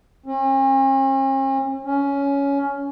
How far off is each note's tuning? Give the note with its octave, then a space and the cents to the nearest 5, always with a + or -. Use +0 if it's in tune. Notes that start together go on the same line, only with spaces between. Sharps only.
C#4 -45
C#4 +15